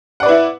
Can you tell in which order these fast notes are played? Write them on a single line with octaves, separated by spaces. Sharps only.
F#5 D5 B4 E4